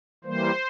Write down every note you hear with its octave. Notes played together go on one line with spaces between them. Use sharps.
E3 G3 A#3 C5